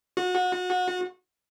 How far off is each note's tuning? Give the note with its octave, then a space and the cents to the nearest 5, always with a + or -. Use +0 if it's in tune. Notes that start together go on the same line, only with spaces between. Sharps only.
F#4 -30